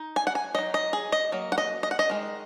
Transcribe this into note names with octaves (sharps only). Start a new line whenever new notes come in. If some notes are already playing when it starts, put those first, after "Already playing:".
Already playing: D#4
G#5
F#5
G#5
F#3 D#4 D#5
D#5
G#4
D#5
F#3 A#3
F#5
D#5
D#5
F#5
D#5
D#3 G#3